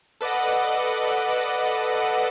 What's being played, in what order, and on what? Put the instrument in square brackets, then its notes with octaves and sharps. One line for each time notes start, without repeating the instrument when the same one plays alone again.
[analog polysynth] A4 B4 D5 D#5 F#5